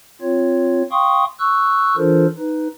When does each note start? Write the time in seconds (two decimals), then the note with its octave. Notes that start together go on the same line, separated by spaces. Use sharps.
0.22 C4 F4 C#5
0.91 F5 G5 C6 C#6 D#6
1.40 C#6 E6 F#6
1.97 E3 D4 F4 A4 A#4 C5
2.38 D#4 B4